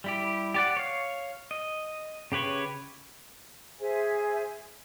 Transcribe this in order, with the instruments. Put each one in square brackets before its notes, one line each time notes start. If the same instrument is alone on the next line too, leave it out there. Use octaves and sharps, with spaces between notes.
[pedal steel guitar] G3 E4 G4
G4 D5 F#5
C#5 F5
D#5
C#3 G4 B4 C#5
[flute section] G#4 C5 E5 G#5